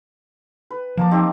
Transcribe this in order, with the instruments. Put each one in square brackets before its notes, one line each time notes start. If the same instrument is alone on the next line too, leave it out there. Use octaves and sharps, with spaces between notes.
[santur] B4
[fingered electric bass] F3 [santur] A#3 A5 D6
[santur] C4 D#4 G4